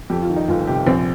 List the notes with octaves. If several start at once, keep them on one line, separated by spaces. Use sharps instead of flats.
F2 G4
F4
D#3
D#4
G1 F4
C3 G4
A#1 C4